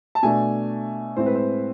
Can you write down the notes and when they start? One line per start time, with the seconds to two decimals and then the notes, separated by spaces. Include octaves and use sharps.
0.15 A5
0.23 B2 A3 D4 G#5
1.17 A2 G#3 C4 C5
1.26 B4
1.35 C5